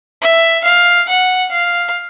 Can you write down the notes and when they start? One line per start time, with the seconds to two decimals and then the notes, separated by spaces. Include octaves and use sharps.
0.21 E5
0.64 F5
1.08 F#5
1.51 F5